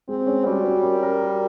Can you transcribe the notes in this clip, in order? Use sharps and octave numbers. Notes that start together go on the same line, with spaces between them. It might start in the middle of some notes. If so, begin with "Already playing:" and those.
G#3 C4
C#4
G3 F#4
C#4
A#4
A#4
F#4